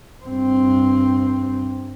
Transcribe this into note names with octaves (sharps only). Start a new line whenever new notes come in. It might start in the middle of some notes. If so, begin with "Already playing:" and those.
G2 C4